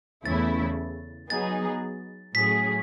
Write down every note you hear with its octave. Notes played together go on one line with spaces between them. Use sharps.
E2 C#3 E3 A3 E4 A6
F#3 B3 D#4 G#4 A6
A2 F#3 C#4 G#4 B6